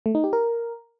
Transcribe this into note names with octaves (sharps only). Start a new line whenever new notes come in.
A3
D#4
G4
A#4